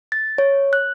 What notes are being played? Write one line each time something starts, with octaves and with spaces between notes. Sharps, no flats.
A6
C#5
F#6